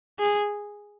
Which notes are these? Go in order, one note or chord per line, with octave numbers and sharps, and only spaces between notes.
G#4